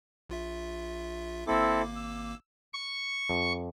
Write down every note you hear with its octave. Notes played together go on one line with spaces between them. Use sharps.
A#1 F4 E5
G#1 A#3 C4 E4 A4 D6
E6
C#6
F2